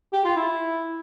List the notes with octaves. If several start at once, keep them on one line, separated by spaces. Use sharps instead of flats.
G4
F4
E4